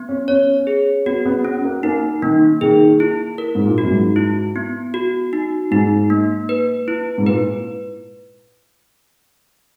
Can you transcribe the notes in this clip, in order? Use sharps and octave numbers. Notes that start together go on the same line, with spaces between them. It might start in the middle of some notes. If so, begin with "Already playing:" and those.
Already playing: B3
C#4
C#4 C#5
G#4
B3 F#4
B3
C#4
A#3
A#3 D#4
D#3 A#3
D#3 G#4
E4
A#4
G#2
A#2
F#4
F#2
G#2
E4
B3
F#4
D#4
G#2 D#4
A#3
B4
E4
G#2
A#2 B4